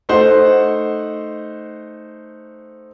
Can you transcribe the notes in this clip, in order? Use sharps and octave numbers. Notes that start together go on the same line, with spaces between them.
A3 D#4 C5 F#5